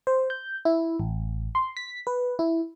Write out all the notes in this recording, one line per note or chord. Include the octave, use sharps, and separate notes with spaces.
C5
G6
E4
A1
C6
B6
B4
E4